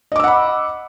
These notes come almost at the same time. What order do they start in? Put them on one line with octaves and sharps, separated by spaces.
D#5 D6 E6 F#5 B5